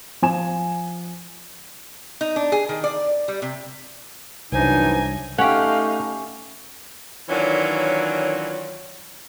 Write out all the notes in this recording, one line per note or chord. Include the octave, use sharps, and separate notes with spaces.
F3 G#5 E7
D#4
D4
G#4
D#3
D5
G3
C3
C2 F#2 E3 D4 D#4 C5 G#5
A3 C#4 D#4 G4 F5 F#5
D#3 E3 F#3 C#4 D4 F4